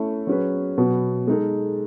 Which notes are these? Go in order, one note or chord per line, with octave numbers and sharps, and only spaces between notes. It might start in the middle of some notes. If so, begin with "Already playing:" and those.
Already playing: A3 C#4 E4
F#3 C#4 G#4 B4
B2 F#3 B3
G#3 D#4 A4